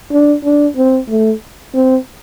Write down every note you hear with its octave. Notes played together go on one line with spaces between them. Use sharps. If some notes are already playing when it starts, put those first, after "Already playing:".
D4
D4
C4
A3
C4